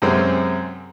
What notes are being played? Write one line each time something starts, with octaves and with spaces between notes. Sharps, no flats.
F#2 C3 G#3 C4 C#4